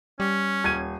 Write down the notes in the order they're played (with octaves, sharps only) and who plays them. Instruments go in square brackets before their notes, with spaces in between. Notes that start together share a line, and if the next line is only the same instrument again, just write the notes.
[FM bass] G3 [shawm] C#4
[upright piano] D#1 G#6 D#7